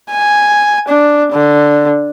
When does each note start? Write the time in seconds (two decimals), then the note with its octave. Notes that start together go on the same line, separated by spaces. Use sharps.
0.11 G#5
0.89 D4
1.32 D3